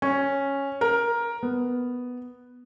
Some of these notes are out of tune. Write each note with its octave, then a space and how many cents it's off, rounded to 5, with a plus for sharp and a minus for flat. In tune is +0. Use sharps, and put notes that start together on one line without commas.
C#4 -5
A#4 +10
B3 +0